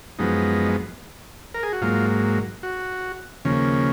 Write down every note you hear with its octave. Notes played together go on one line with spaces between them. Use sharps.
F#2 F3 G#3 B3 D#4
A#4
G#4
F#4
G#2 F#3 A#3 F4
F#4
D#2 C#3 F3 A#3 C#4